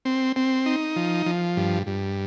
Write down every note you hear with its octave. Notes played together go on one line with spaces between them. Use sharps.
C4
C4
D#4
F3
F3
G2
G2